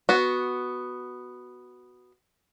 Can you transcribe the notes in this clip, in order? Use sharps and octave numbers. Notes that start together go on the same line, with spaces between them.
B3 F#4